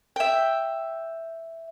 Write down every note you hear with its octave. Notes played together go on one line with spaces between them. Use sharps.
E5 G5